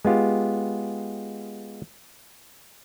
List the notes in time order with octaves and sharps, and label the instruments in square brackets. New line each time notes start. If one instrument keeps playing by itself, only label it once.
[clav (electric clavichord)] G#3 B3 F4 G4